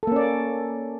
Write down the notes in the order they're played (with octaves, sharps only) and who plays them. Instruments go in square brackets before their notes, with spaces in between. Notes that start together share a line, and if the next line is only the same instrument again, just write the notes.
[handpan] A4
A#3
C#4
D5